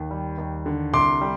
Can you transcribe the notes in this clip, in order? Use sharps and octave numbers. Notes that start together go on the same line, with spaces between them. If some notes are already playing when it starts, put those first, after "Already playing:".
Already playing: D#2
G3
D#2
D3
C2 C6 D6
G3